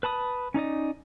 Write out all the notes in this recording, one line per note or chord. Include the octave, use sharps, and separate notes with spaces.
B4 A5 B5 D#6
C#4 D#4 D5 D#5